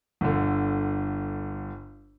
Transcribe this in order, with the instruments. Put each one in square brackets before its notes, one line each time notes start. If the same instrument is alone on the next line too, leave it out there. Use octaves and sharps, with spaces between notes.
[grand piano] G1 D3